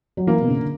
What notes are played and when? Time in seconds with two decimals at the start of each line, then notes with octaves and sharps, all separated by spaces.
0.17 F#3
0.27 E3 A#3
0.41 B2
0.47 C#3
0.55 D3